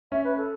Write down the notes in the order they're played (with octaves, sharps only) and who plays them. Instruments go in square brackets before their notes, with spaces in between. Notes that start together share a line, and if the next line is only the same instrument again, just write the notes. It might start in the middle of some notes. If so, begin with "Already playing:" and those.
[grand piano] C#4 [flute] E5
[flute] B4
A4